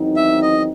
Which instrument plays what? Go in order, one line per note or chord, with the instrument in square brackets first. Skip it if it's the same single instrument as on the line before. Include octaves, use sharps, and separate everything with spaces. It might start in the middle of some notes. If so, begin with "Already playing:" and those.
Already playing: [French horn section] E2 D#3 F#3 C4 D#4
[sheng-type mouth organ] E5
D#5